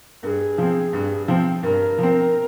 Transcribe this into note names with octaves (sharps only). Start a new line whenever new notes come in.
G2 G#4 A#4
F3 C4
G2
F3 C4
G2 A#4
F3 C4